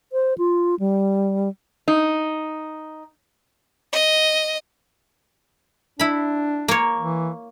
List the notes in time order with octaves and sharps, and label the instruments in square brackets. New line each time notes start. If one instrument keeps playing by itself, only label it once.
[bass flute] C5
F4
G3
[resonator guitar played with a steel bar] D#4
[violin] D#5
[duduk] D4 [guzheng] E4 B5
[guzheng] A#3 C#5
[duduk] E3